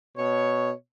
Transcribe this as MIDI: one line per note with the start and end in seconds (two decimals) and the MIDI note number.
0.16 0.71 47
0.16 0.71 73